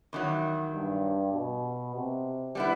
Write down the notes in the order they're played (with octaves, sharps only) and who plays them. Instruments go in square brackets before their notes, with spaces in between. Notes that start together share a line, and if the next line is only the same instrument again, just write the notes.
[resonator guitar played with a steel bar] E2 D#3 F#3
[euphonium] G2
B2
C3
[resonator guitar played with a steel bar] G3 B3 E4